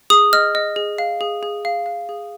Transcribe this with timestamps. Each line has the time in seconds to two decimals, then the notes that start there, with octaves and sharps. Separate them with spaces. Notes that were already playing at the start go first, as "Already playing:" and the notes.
0.10 G#4 D#6
0.33 D#5 F6
0.55 D#5
0.76 G#4
0.98 F5
1.21 G#4
1.43 G#4
1.65 F5
1.86 F5
2.09 G#4